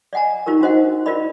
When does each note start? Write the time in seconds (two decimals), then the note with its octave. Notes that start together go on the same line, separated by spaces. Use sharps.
0.13 D5 D#5 F#5 G#5 A#5
0.46 D#4 F4 G4 A#4
0.61 D4 F#4 C5 D#5 F#5
1.06 E4 F4 A#4 D5 D#5 B5